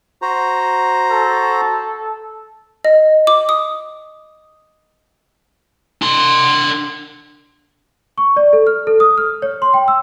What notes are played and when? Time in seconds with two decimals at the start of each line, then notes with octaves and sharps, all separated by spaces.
0.22 F#4 C5 A#5
1.12 A4
2.85 D#5
3.27 D6
3.49 D#6
6.02 D4 C6
8.18 C#6
8.37 D5
8.53 A4
8.67 F6
8.87 A4
9.00 D#6
9.18 F6
9.42 C#5
9.62 C6
9.74 G5
9.88 E6